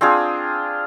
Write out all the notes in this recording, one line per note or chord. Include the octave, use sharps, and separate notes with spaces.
C4 D4 F4 G#4